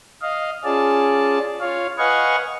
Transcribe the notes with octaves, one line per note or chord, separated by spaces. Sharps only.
D#5 F5
C#4 F4 G#4 D5 A5
F4 C#5 F5
B4 D#5 F5 F#5 G#5 C#6